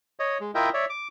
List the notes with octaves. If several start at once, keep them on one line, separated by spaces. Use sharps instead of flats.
C#5 D#5
G#3
E4 F4 A#4 D#5 E5 G5
C#5 D5 E5
D6